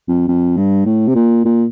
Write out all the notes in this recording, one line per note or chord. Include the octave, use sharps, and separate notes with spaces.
F2
F2
G2
A2
C3
A#2
A#2